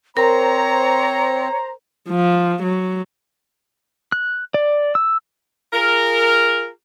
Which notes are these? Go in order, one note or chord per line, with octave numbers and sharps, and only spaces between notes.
C4 A#4 C5 C#5 A#5
F3
F#3
F#6
D5
E6
F4 G#4 A#4